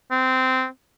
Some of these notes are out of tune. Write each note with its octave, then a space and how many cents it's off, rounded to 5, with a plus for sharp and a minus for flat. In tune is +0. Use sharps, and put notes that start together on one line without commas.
C4 -15